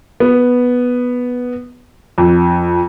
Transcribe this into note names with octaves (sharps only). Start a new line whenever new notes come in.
B3
F2